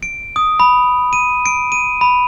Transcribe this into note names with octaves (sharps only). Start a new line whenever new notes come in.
D7
D#6
B5
D#7
D7
D#7
B5